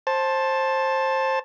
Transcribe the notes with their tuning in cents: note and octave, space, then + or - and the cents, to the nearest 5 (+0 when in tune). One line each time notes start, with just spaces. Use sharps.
C5 +20 A5 +0